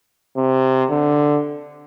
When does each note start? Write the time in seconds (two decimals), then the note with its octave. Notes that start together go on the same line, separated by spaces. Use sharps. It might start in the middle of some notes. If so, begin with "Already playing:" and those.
0.37 C3
0.91 D3